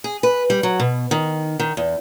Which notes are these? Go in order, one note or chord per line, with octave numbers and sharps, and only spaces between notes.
G#4
B4
G3
F#3
B2
D#3
D#3
E2